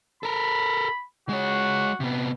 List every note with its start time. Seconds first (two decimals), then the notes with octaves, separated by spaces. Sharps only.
0.23 A4 A#4 B5
1.29 G#3 F#4 C#5
2.00 C3 B3